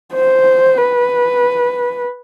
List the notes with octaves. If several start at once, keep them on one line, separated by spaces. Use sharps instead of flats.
C5
B4